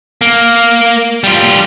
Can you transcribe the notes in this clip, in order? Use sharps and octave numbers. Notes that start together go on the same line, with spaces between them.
A#3
G3 F4